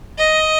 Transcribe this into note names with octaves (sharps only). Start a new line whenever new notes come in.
D#5